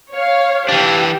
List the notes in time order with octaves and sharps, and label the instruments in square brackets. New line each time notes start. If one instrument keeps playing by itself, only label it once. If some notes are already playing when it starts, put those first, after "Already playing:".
[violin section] C#5 F5
[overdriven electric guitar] E3 D4 [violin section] G4